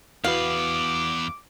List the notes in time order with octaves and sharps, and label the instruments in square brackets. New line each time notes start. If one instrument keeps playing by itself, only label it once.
[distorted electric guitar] E2 B3 [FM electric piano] E4 F#4 B4 [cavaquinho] F5 [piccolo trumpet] D6